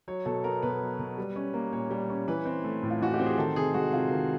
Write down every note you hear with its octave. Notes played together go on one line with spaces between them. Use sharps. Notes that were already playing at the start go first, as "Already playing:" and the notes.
F#3 C#5
B2 A4
B3 A#4
B2 B4
F#3
B2
G3
C#4
A#3
A#2 C#5
G3
C#4
E3 B4
C4
A3
A2
F4
E3 F#4
G4
C4
G#4
D#3 A4
C3 G#4
G#3 F#4
C3 F4
D#3